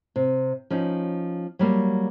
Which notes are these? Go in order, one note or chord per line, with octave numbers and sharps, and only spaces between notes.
C3
F3 C#4 D#4
F#3 G3 A#3